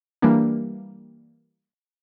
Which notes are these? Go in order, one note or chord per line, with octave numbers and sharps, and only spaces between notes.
E3 G3 A#3 D4